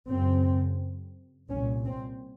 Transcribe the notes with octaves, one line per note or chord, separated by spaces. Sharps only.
F#2 C#3 C4
C2 A#2 C#4
C4